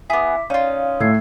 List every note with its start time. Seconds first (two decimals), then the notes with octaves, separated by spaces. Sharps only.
0.10 B3 E4 G#4 D6 B6
0.50 C#4 D#4 F4 D5 F5
1.00 A2 E6 G#6 C7